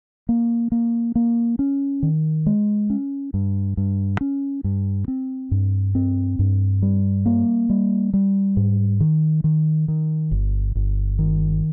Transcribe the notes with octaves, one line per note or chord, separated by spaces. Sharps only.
A#3
A#3
A#3
C#4
D#3
G#3
C#4
G2
G2
C#4
G2
C4
G2
C4
G2
G3
A#3
G3
G3
G#2
D#3
D#3
D#3
G1
G1
D#3